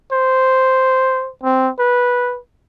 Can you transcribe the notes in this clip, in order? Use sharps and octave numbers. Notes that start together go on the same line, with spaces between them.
C5
C4
B4